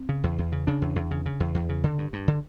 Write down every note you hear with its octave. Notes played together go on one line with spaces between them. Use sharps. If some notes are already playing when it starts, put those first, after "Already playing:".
Already playing: C4
C#3
E2
E2
C#3
C#3 D4
E2
E2
C#3
C#3
E2
E2
C#3
D3
G2
G2
D3